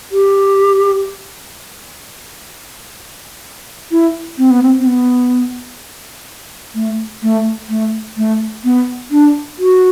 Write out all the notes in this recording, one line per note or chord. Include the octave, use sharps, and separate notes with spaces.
G4
E4
C4
B3
C4
C4
B3
A3
A3
A3
A3
B3
D4
F#4